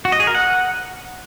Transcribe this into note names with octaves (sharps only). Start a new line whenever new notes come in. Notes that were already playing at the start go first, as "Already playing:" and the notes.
F#4
D#5
G#4
A#4
F#5